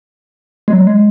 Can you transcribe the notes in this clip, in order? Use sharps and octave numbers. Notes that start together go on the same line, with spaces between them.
G#3
F#3
G#3